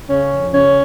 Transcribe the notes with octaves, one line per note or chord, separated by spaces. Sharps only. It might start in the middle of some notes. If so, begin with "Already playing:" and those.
C#3 C#4
F2
C#3 C#4